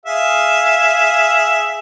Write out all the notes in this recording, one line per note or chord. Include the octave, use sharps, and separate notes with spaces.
G#4 E5 F5